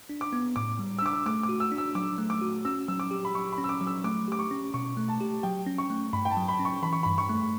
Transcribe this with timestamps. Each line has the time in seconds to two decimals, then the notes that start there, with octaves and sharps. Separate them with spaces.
0.09 D4
0.21 D6
0.33 B3
0.56 A2 D6
0.79 G3
0.99 E6
1.02 D4 D6
1.13 E6
1.26 A3 D6
1.43 D6
1.49 F#4
1.60 E6
1.72 D4
1.78 E6
1.95 F#3 D6
2.18 A3
2.30 D6
2.41 F#4
2.65 C#4 E6
2.88 F#3 E6
3.00 D6
3.11 G4
3.25 B5
3.35 F#3 C#6
3.52 B5
3.58 C#4
3.64 E6
3.69 D6
3.81 F#3
3.87 E6
4.04 A3 D6
4.28 G4 D6
4.39 C#6
4.51 C#4
4.74 B2 C#6
4.97 A3
5.08 A5
5.21 G4
5.43 F#3 G5
5.67 C#4
5.78 C#6
5.90 A3
6.13 G2 B5
6.25 G5
6.31 A5
6.37 F#3
6.49 B5
6.59 C#4
6.65 C#6
6.83 E3 B5
6.93 C#6
7.03 G2 B5
7.18 C#6
7.29 A3